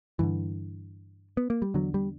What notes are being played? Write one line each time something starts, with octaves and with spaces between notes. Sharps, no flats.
G2 D3 E3
B3
A#3
G3
E2 D3 F#3
G3